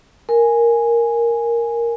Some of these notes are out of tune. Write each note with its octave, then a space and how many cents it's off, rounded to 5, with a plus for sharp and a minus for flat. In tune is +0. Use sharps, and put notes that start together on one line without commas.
A#4 +0 G#5 +0